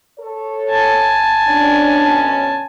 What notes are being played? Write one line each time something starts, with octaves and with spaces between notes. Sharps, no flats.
A4 C#5
G#5 A5
D2 B2 C#4 D4